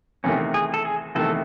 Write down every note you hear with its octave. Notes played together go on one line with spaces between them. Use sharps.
E2 C3 D#3 A3 C#4
G#4
A4
G#4
E2 C3 D#3 A3 A4